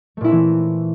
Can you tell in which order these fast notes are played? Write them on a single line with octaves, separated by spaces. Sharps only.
A3 A#2 E4 C4 E3